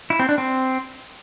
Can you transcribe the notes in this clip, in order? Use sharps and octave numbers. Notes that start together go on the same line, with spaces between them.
E4
C4
D4
C4